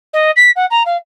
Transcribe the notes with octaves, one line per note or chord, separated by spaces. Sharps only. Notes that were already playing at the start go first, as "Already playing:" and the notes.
D#5
B6
F#5
A#5
F5